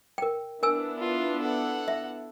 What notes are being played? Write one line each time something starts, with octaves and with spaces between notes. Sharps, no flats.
A#4 G5
B3 D4 E4 A#4 G#5 E6
F4
A4 F#5
E5